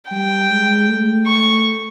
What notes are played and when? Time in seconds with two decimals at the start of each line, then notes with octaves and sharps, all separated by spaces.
0.11 G3 G5
0.50 G#3
0.89 A3
1.27 C#6